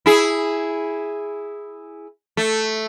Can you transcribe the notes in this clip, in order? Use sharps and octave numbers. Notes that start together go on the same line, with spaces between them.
E4 G#4
A3